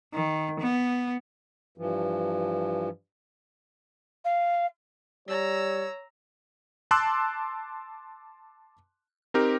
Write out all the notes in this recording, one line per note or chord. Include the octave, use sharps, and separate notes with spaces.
D#3
B3
G2 E3 F3
F5
G3 C#5 A#5 E6
A5 C6 D6 E6 F#6
C4 D#4 G4 A#4